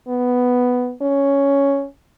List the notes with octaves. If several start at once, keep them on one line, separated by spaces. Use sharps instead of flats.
B3
C#4